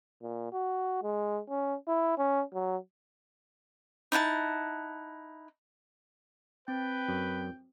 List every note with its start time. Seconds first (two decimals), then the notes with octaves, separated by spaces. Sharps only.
0.22 A#2
0.53 F#4
1.03 G#3
1.49 C#4
1.88 E4
2.18 C#4
2.54 F#3
4.12 D#4 E4 F#5 A5
6.68 C4 B4 G5
7.09 F#2